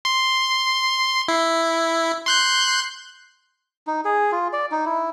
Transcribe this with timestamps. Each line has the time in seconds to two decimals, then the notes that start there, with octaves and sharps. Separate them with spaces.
0.05 C6
1.28 E4
2.26 C6 F#6 G6
3.87 D#4
4.05 G#4
4.32 F4
4.53 D5
4.72 D#4
4.86 E4